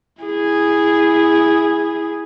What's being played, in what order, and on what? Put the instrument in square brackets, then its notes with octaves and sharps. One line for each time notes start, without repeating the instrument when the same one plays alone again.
[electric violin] E4 G#4